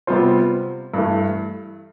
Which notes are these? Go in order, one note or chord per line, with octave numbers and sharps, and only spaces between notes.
C3 G3 B3 F4 C5
G2 E3 A3